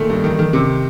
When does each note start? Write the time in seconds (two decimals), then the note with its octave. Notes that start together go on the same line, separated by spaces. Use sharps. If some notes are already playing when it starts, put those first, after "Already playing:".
Already playing: A#2 D#3 A3
0.10 G2
0.24 D#3
0.39 D#3
0.53 C3